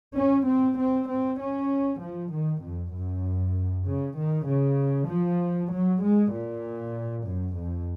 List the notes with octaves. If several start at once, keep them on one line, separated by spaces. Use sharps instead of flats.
C#4
C4
C4
C4
C#4
F3
D#3
F2
F#2
C#3
D#3
C#3
F3
F#3
G#3
A#2
F#2
F2